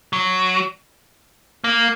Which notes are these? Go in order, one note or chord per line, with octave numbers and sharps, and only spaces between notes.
F#3
A#3